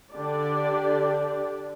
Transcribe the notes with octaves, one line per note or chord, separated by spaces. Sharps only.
D3 D4 G4 D5